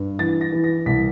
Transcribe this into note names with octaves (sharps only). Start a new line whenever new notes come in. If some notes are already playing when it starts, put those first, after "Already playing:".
Already playing: G2
E3 A6
A#6
E3
A#6
C2 B6